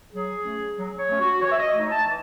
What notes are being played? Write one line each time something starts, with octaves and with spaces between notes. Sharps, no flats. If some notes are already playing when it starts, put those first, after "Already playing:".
F#3 G#4
A3 C#4
F#3
C#5
A3 C#4
F#4
E3 C#5
E5
D#5
A3 D#4
A5
E3